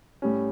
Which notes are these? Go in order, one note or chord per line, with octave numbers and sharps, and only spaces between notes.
A2 G3 C#4